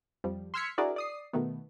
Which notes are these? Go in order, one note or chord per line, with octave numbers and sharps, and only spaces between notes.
F2 F3 G3
C6 E6 F6 G#6 B6 C#7
D4 E4 F#4 G#4 A#4 D5
D5 D#6 C7
B2 D#3 A3 B3